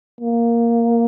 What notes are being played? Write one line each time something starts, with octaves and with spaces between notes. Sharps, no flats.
A#3